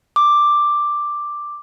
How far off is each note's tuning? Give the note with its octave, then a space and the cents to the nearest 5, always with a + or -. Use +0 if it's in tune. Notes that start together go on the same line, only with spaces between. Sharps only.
D6 +5